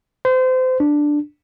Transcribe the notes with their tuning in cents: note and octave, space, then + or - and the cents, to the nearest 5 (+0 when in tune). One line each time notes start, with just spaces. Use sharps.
C5 -30
D4 +5